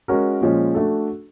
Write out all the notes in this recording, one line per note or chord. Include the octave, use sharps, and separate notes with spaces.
G#3 C#4 F#4 A#4
A#2 F3 G#3 C#4
A3 D4 F#4 A4